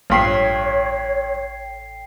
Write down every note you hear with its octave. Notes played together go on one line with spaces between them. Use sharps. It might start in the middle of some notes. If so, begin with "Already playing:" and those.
A1 G2 F3 C#5 G5 C7